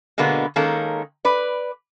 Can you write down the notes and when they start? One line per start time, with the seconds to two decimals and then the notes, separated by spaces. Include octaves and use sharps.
0.18 B2 D3 G#3 A#3 B3
0.56 D#3 G#3 A#3 C#4 A4
1.25 B4 D5